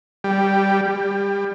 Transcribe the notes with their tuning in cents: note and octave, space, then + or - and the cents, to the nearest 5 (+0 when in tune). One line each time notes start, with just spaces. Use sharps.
G3 +0
G3 +25